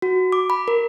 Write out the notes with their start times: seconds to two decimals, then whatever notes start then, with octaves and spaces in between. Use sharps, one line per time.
0.02 F#4
0.32 D6
0.50 B5
0.68 A#4